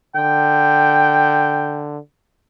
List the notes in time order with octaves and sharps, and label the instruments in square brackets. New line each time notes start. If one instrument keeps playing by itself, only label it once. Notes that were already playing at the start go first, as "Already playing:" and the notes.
[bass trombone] D3 [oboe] G5